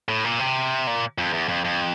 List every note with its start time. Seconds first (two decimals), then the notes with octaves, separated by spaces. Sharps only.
0.09 A2
0.24 A#2
0.39 C3
0.87 A#2
1.18 F2
1.33 E2
1.48 F2
1.64 F2